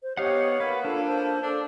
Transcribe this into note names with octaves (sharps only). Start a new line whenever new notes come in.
C5
B3 D#4 G4 C#5 F5 F#5
A#3 B4 F#5
D4 F4 A4
C5 A5
D4 A4